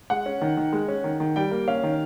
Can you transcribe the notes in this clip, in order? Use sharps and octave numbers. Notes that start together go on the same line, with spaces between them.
G#3 F#5
C#4
D#3
D#3
G#3
C#4
D#3
D#3
G3 G5
A#3
C#4 F5
D#3